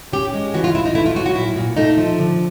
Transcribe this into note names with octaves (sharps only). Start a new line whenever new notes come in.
C#4 G4
G#3
E3 F#4
F4
E3 E4
D#4
A3 E4
F4
F#3 F#4
F#4
A#2 E4
A#2
A3 D#4
F3
D3